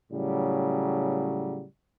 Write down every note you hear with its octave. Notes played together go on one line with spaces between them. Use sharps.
A2 C#3 F#3 G3